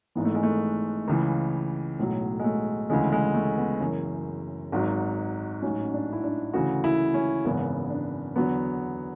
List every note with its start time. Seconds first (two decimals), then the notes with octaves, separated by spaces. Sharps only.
0.15 G#1 G#2 E3 B3
0.25 A3
0.35 G#3
0.43 A3
1.08 C#2 C#3 E3
1.98 B1 A2 F#3 G#3
2.40 G#3
2.44 A3
2.90 D2 C#3 E3 G#3
3.12 G#3
3.34 A3
3.58 B3
3.80 F#1 F#2 E3 C#4
4.72 G#1 G#2 F#3
5.62 A1 G#2 F#3 C#4
5.94 D4
6.13 E4
6.24 D4
6.53 D2 C#3 E3 F#4
6.84 E4
7.14 C#4
7.45 G#1 F#2 C#3 E3 B3
7.90 D4
8.36 E2 D3 F#3 B3